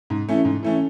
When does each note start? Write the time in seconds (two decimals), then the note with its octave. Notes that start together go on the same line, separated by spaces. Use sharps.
0.10 G#2
0.29 E3 A3 C#4
0.45 G#2
0.63 E3 A3 C#4